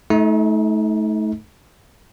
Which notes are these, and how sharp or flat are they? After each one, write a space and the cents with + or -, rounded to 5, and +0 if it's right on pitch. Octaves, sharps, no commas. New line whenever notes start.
A3 -25 D#4 +35